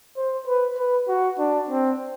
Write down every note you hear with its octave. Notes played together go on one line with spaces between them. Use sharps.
C5
B4
B4
F#4
D4
C4